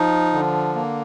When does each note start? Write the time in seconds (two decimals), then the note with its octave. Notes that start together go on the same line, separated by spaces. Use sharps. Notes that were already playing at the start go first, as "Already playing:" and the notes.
Already playing: F3 D#4
0.33 D3
0.75 A#3